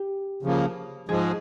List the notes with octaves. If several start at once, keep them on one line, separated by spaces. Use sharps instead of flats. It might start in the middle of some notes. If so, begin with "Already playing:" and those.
Already playing: G4
C#3 F3 A#3
G#2 F3 G#3 G#4